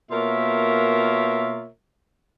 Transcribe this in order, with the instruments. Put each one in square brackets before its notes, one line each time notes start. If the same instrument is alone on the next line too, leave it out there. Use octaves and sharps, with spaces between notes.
[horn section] B2 A#3 F4 A#4 C#5 E5